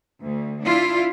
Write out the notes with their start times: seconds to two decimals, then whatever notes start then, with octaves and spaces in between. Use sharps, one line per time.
0.23 D2
0.66 D4 E4 F4